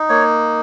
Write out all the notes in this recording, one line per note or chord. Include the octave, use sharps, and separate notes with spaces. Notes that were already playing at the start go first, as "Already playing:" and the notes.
Already playing: D#4
A#3 C#5